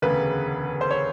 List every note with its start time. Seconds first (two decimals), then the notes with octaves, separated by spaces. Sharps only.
0.02 E1 D2 C#3 B4
0.81 C5
0.91 C#5